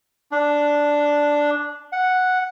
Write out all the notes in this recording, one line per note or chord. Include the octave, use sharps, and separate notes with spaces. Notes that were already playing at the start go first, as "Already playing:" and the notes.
D4
F#5